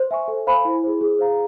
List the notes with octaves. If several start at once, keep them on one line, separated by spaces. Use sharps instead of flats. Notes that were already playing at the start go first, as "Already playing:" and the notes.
Already playing: C5
E5 G#5 C#6
A4
C5 F5 G#5 B5
E4
G#4 C5
G#4
C5 F5 A#5